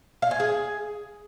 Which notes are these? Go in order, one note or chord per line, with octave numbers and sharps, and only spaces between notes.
F5
G#5
G#4